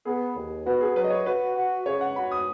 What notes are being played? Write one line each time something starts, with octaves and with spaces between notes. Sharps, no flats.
B3 G#4
D#2
B3 F#4
G#4
F#3 B4
D#5
C#5
F#4 B4
F#4
C#3 C#5
F#5
F#4 B5
D#6